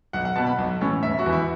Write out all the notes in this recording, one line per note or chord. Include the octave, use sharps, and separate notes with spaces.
B1 F#5
F#5
B2 B3 A5
B5
B1
A2 E3 C#4
E1 E5
F#4
E2 E3
E4